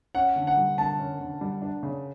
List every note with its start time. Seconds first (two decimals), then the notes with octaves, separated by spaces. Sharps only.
0.15 C#4 F#5
0.36 D3
0.47 F#5
0.57 G3
0.78 D3 A5
0.99 C#4
1.21 D3
1.41 G3
1.62 D4
1.83 C#3